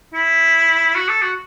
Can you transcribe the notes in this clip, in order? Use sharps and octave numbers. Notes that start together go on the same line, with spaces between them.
E4
F#4
A4
F#4